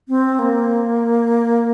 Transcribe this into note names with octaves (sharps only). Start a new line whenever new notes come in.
C4
A#3